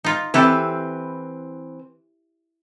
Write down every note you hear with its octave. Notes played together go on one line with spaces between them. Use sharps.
D#4 F4
E3 C4 E4 G4 A4 B4